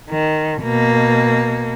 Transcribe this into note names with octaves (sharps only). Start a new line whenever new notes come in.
D#3
B2 A#3